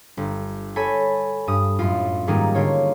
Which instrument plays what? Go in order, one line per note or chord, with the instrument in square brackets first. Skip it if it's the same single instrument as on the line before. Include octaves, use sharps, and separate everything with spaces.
[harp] G1
A4 C#5 G#5 B5
G2 D#6
F#2 A2 F4
G#2 D#3 G3 A#3 D#4 G#4
D3 F4 C#5